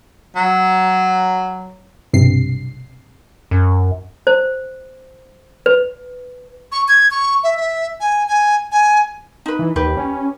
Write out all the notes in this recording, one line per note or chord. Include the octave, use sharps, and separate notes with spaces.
F#3
B1 G2 C3 C7
F#2
C5
B4
C#6
G#6
C#6
E5
E5
G#5
G#5
G#5
D#4 B4
E3
D#2 G4 B4
C#4